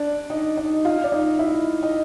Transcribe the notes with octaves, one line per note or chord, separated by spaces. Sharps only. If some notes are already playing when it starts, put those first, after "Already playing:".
Already playing: D4 D5
D#4 D#5
D#4 D#5
F4 F5
D5
D#4 D#5
E4 E5
D#5